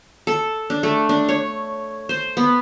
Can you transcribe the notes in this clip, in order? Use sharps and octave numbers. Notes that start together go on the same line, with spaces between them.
A4
D4
A3
D4
C#5
C5
B3